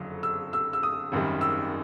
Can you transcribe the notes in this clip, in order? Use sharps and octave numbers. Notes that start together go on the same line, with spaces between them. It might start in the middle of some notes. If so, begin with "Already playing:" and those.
Already playing: F#1 F2 D3 F#3
E6
E6
E6
D#6
G#1 F#2 D#3 G3
E6